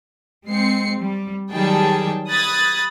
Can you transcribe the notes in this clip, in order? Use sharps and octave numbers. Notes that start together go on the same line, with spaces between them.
G#3 C4 C7 C#7
G3
D#3 F#3 G3 G#4 G5 A5
B5 D#6 F#6 G#6 A6